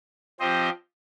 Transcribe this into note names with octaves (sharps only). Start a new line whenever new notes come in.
F3 C4 G4 C5 D#5